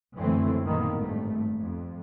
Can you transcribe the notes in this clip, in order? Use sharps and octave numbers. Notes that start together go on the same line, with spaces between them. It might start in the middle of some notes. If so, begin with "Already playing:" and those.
F#1 F#2 D3 E3 A3 C4
A#1 A2 D#3 A#3 B3
G#1 G2 A3
F2